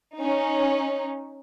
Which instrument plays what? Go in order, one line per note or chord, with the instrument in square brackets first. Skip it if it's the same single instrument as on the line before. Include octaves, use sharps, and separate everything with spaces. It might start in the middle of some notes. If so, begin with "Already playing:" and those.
[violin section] C#4 D#4